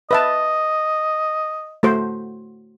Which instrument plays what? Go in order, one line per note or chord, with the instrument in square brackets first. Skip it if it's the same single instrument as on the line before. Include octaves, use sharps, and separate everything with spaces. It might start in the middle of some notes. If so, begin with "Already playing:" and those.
[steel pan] B4 E5 A5 [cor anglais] D#5
[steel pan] A3 F#4 C5